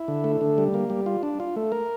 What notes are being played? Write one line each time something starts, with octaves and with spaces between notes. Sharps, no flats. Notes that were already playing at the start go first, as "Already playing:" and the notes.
Already playing: E4
D3
A3
D3
G3
A#3
G3
F4
D4
F4
A3
A#4